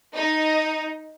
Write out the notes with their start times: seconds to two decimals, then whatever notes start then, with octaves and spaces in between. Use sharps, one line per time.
0.14 D#4